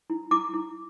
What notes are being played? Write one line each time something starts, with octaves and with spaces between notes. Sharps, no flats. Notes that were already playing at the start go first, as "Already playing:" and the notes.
E4
E4 D6
E4